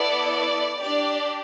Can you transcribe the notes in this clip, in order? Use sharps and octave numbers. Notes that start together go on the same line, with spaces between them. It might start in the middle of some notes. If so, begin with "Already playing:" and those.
Already playing: B3 E4 A4 D5
D5
D4 G4 D5